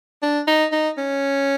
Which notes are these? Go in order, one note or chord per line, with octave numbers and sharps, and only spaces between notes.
D4
D#4
D#4
C#4